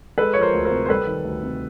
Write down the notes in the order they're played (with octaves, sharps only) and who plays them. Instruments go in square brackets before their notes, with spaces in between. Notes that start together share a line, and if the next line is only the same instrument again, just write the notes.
[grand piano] G#3 A4 B4
F3 C#5
A#4 C5
D2
A#4 C5
C3
C5
G3 A4 B4
D#3
D2
C3